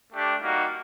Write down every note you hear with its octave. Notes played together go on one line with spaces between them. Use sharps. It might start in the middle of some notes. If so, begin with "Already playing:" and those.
A3 D4 G4
G3 A#3 D#4 F#4